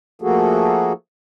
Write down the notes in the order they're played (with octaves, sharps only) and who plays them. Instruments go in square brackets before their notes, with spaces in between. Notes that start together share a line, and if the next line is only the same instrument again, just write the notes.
[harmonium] F3 A3 A#3 F#4 G#4 A4